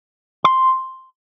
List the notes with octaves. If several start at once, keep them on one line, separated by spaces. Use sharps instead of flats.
C6